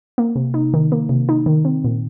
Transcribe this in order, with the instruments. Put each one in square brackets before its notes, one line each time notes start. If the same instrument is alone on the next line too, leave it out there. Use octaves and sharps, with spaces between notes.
[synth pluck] A#3
C3
D#4
D#3
A#3
C3
D#4
D#3
C4
A#2